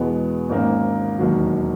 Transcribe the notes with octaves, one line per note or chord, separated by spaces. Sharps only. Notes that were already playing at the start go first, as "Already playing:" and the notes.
Already playing: E2 B2 G#3 B3
G#1 G#2 D#3 A#3 C#4
E1 D#2 D#3 F#3